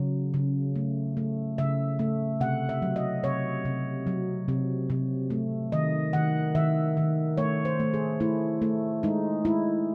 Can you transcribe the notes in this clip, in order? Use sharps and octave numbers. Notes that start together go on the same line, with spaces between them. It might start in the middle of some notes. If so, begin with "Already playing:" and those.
Already playing: C#3 F#3
C#3
A3
A3
C#3 E5
A3
C3 F#5
E5
F#3
D#5
C3 C#5
C3
F#3
C3
C3
A3
D#3 D#5
D#3 F#5
D#3 E5
D#3
A3 C#5
C5
A3
G#4
A3 E4
A3
G#3 D#4
G#3 E4